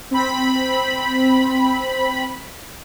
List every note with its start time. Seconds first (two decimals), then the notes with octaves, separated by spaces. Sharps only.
0.11 C4 B5